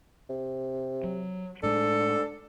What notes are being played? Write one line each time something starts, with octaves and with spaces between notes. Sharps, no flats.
C3
F#3
A2 G#3 D4 A4